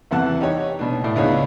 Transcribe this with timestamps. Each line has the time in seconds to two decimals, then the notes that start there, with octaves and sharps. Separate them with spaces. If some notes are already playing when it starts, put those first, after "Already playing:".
0.11 E2 C3 E3 F#5 A5 F#6
0.41 D#4 G4 C#5
0.79 B2 D4
1.04 A2 E4 D5
1.16 C#2 B3 D4 D#4 G#4 C#5